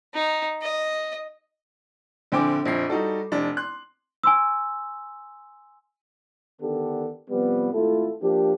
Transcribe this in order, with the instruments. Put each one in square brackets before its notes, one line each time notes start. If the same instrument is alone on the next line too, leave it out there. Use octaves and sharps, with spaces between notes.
[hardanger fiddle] D#4
D#5
[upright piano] A#1 D3 C4 G5 G#5 D6
A#1 F2 C7
G3 D#4 F#4 A4
F1 D4
C6 F#6
[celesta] G#5 C6 E6
[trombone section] D3 D#3 B3 D4 G4 A4
C3 F3 G3 B3
G#1 A3 E4 F4 A4
F3 A#3 D4 G4